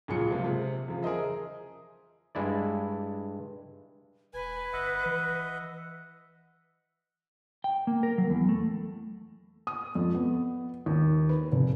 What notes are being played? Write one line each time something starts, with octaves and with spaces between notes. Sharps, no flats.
C#2 A#2 F#3 G#4 C#7
C3 F3 G#3 A#3
C3
E2 C#3 F3
G#4 A#4 C5 D#5 E5
G2 G#3 E4 D5
E1 B4 G#5
G1 D#5 E5 F#5
E3
G5
A#3
A#4
F#3
E2
A3
D#6
F2
B3
D#2
B4
F1